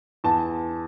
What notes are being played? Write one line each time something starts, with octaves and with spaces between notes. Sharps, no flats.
E2 A5